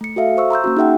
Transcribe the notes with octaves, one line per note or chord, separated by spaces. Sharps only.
A3 C#7
F#4 A4 E5 F5
C5 C#6 E6
A#5 C6 E6 G6
A#3 C#4 F#4
D#4 G#4 E5 F#5 G5